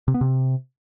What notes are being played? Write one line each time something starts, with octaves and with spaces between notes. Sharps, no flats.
C3
B3
C3